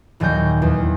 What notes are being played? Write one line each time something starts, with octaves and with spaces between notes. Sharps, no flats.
D#1 D#2 F#3 G#5 G6 A#6
E2